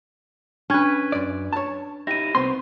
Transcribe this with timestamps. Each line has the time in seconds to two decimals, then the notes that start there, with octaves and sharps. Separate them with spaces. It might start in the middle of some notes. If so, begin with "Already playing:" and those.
0.70 C#4 D4 B4 G#6
1.12 F#2 D5
1.53 C#5 A5
2.07 D#4 E4 G4 A#6 D#7
2.35 C2 B3 C4 C6